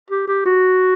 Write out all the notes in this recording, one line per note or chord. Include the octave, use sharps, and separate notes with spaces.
G4
G4
F#4